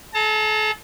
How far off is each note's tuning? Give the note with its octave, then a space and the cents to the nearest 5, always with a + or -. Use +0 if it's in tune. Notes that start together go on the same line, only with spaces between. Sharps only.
A4 -40 A5 +45